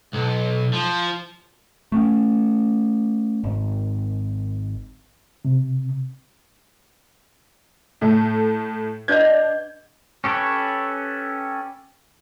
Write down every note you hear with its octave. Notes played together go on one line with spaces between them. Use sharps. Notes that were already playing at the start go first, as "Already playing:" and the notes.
B1
F3
A3 A#3 C#4
G#1
C3
A2 A3
D4 B4 D#5 F#5 G6 G#6
C#4 G4 A4 B4 C#5